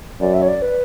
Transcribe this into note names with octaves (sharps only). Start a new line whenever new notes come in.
F#2 D5
E5
C#5
D5
B4